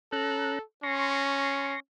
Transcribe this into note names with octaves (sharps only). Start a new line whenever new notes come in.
C#4 A4 A#5 F#6
C#4 C6 C#6 A#6